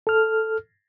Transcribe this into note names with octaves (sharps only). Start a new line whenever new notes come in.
A4 F6